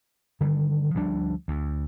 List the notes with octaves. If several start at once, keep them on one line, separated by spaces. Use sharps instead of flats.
D3 D#3 G3
D2 F3 G3 D4
D2